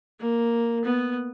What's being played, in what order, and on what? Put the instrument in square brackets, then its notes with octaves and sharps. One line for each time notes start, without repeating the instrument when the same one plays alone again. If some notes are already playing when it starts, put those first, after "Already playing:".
[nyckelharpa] A#3
B3